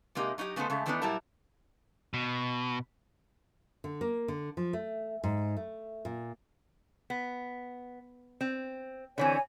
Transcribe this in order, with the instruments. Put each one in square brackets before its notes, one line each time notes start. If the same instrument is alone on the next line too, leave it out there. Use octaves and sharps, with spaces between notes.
[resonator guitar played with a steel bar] C3 G#3 A#3 D#4 G4
F#3 D#4 E4 G4
C#3 A3 B3 D#4 A4 C5
C#3 G#3 A3
D#3 E3 A3 B3 D4 D#4
A#2 F#3 G3 E4 A#4 A5
[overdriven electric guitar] B2
[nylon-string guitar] D3
A#3
D3
F3
A3
G#2
A3
A#2
[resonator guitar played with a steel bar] B3
C4
[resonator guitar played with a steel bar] D3 E3 C4 [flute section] C#5 G#5